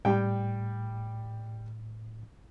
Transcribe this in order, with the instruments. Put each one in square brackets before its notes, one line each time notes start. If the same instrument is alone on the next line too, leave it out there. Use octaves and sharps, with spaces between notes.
[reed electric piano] A2 [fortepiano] G3 G5